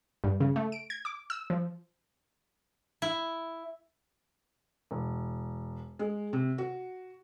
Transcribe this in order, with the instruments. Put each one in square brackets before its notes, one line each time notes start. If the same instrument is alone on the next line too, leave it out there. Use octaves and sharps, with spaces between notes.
[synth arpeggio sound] G2
C#3
A3
D7
G#6
D6
E6
F3
[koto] E4
[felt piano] E1
G#3
C3
F#4